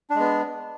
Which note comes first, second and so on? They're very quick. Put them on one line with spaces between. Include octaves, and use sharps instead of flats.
D4 G#3 B3